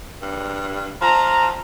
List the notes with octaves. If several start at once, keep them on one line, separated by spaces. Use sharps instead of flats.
G2
F3 A#5